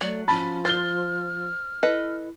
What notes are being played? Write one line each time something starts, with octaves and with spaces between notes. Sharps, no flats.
F#3 A3 D5
F3 C#4 A5 B5 A6
C5 F6 A6 G7
E4 A4 B4 D#5